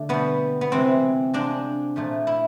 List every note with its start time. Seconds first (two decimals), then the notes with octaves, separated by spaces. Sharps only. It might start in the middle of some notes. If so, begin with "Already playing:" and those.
Already playing: D3 A3
0.09 B2 G3 B3
0.61 B3
0.71 C3 E3 G#3 C4
1.34 C3 F3 G#3 D4
1.96 A#2 F3 A3
2.27 E4